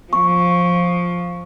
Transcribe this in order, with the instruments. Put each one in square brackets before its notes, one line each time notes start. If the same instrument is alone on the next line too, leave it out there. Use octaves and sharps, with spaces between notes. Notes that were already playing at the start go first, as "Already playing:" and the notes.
[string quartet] F3 [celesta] C#6